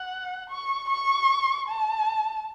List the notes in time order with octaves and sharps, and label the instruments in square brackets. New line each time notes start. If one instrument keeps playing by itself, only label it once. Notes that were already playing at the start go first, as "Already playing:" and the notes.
Already playing: [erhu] F#5
C#6
C#6
A5